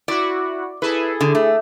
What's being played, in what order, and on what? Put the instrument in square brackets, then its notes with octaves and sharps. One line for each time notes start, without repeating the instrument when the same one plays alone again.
[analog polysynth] E4 F#4 [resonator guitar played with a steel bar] D5
[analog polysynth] E4 G#4 A4 [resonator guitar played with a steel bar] B4
[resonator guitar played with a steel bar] D3
A3